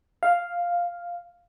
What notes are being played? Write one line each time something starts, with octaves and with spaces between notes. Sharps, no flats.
F5